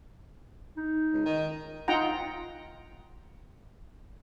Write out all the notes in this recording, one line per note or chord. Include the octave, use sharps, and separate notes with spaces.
D#4
C#2
D#3
D#4 F4 F#5 G5 A#5